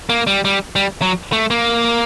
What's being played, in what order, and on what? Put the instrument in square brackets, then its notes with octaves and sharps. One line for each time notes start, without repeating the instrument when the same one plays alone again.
[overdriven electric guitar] A#3
G3
G3
G3
F#3
A3
A#3